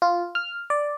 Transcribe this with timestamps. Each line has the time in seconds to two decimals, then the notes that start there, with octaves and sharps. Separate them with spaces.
0.02 F4
0.35 F6
0.70 D5